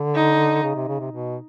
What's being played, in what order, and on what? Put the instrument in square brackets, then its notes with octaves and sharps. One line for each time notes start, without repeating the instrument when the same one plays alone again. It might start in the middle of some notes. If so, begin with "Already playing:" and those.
Already playing: [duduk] D3
[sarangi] D#4
[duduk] C#3
C3
C#3
C3
B2